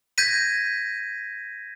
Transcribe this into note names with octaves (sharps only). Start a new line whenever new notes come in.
G6 G#6 A#6 B6 D#7